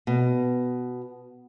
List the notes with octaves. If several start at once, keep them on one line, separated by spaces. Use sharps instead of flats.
B2